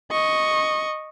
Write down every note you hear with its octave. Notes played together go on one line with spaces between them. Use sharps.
D#5 C#6